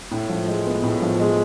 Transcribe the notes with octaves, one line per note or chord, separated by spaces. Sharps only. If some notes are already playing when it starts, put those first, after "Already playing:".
A2
F3
G#3
B3
A2
F3
G#3